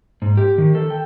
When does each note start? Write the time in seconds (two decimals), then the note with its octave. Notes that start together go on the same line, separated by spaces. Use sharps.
0.22 G#2
0.37 G4
0.58 D#3
0.75 A4
0.90 G5